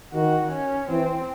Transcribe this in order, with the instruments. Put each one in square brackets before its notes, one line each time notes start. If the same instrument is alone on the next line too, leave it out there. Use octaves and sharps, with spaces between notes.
[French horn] D#3 [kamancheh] F#4
[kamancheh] C#4
[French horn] E3 [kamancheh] C4